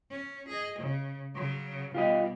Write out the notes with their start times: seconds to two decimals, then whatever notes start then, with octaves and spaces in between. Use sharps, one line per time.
0.10 C#4
0.48 G#4 D#5
0.79 C#3
1.35 C#3 F#3
1.94 B2 G3 F4 G4 D#5